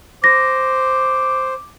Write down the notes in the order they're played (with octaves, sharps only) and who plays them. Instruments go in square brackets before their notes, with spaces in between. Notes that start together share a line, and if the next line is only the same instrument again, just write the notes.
[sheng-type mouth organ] C5 [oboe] D6 [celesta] A#6